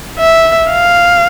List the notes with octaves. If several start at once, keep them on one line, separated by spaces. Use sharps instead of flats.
E5
F5